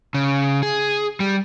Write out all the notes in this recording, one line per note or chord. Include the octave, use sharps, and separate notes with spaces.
C#3
G#4
G3